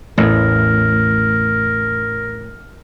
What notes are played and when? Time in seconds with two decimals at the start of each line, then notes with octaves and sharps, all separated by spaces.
0.18 A1 E2 A2 A#4